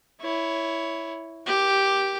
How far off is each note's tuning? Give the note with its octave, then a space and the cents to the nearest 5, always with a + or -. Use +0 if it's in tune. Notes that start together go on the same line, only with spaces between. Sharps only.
E4 +0 C#5 +10
G4 +0 A#4 +40